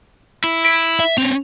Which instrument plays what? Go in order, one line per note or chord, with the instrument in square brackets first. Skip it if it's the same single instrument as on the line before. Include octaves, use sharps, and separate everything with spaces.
[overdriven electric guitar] E4
[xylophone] B6 D7
[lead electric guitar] E5
[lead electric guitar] C4 C#4 [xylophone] F7